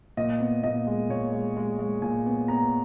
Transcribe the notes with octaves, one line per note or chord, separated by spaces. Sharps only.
A#2 D#5
B3
A#2 D#5
G#3
A#2 C#5
G#3
G#3
G#3
A#2 G#5
B3
B3 A#5